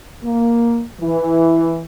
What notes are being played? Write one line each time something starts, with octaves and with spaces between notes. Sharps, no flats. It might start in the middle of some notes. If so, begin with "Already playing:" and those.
A#3
E3